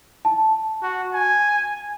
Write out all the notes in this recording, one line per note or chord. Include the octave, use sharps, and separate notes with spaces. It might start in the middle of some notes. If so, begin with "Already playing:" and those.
A5
F#4
G#5